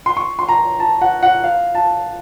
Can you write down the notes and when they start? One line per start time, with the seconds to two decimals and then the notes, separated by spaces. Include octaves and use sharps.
0.06 C6
0.17 C#6
0.39 C6
0.49 A#5
0.80 A5
1.01 F#5
1.23 F#5
1.44 F5
1.75 A5